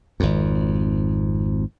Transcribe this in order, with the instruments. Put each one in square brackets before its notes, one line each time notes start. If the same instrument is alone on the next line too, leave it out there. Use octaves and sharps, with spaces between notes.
[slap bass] G#1 F2